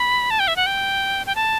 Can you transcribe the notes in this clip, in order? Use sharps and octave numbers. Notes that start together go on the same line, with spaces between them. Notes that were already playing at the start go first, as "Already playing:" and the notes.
Already playing: B5
A5
G5
E5
F#5
G5
G5
A5